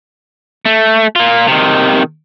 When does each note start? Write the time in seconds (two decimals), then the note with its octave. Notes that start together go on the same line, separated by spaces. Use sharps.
0.65 A3
1.16 A#3 F4
1.48 C3 D#3